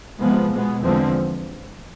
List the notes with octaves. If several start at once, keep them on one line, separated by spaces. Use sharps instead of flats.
C3 F3 G#3 B3
B2 G#3 B3
E2 D3 F3 G#3 C4